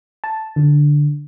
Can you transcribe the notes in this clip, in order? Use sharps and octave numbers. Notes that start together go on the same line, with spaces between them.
A5
D3